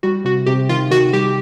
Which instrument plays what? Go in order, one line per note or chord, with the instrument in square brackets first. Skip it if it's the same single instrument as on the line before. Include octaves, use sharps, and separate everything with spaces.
[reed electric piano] G3 [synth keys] F#4
[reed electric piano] C3 [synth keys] F#4
[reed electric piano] C3 [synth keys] G4
[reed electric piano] D#3 [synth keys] F4
[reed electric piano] D#3 [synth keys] F#4
[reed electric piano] G3 [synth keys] G4